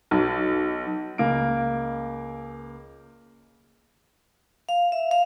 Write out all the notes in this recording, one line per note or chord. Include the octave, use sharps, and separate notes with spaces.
B1
C#2 A#3 D7
F5
E5
F5